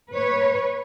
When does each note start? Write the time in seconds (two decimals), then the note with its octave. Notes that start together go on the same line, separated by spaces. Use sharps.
0.13 B4 C#5